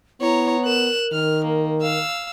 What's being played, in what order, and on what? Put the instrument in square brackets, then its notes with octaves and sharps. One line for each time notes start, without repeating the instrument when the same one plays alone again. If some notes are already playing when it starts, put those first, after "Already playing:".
[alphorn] B3 [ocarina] E4 [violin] C#5 A#5
[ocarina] A#4 [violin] F#6 E7
[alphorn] D#3 [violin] F6
[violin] A#3
F5 E6